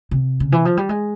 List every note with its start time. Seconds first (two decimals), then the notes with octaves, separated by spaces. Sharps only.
0.11 C3
0.40 C#3
0.52 E3
0.65 F3
0.77 G3
0.89 G#3